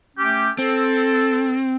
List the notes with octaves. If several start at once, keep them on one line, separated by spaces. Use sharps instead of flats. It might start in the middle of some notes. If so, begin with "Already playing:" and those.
A3 C#4 G4
C4 A4